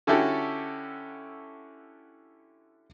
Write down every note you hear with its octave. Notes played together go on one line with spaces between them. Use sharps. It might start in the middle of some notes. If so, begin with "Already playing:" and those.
D3 C#4 E4 F#4 G4 A4